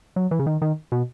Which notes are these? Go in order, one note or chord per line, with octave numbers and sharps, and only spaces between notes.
F#3
E3
C#3
D#3
D#3
B2